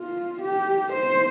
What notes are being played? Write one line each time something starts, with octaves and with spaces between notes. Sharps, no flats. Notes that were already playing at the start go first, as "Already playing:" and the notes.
Already playing: F4
G4
C5